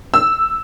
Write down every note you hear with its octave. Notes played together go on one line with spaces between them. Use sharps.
E6